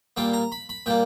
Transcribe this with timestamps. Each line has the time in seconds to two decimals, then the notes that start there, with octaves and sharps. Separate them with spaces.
0.17 A#2 G3 A#3 G5
0.34 A#5
0.52 B5
0.69 B5
0.86 A#2 G3 A#3 G5